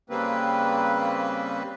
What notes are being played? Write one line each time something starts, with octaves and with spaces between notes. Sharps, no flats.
C#3 G3 A#3 C4 B4